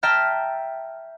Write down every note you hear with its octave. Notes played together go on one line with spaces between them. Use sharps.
E5 G5 A5 A#5 F6 G6